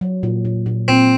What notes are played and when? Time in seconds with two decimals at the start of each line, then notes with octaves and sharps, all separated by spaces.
0.01 F#3
0.23 A#2
0.45 A#2
0.66 A#2
0.88 A#2 C4